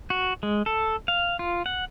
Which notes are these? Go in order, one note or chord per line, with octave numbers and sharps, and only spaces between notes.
F#4
G#3
A4
F5
F4
F#5